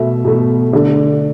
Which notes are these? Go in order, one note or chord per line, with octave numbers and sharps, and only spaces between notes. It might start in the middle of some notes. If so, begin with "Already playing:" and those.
Already playing: B2 A3 E5
B2 A3
D3 A3